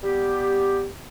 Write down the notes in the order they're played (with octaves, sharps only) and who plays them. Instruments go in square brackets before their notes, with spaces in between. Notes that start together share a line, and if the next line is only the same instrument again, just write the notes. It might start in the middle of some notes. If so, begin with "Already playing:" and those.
[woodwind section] G3 B3 G4